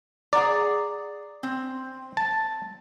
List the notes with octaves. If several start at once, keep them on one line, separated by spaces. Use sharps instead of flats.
G#4 D5 F#5 A#5
C4
A5